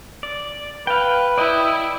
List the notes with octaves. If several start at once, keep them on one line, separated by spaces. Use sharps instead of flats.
D5
B4 F5 G5
E4 D5 D#5 G5